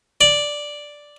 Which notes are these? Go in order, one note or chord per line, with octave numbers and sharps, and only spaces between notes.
D5